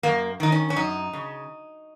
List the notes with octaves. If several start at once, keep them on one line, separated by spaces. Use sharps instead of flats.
F#2 A#3
D#3 D#4
C#4
C#4
F#2 D#4
C#3